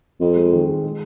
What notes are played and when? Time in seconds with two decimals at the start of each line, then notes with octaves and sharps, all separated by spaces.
0.21 F2 C4
0.36 G#3
0.53 D#3
0.68 G#3
0.84 G#3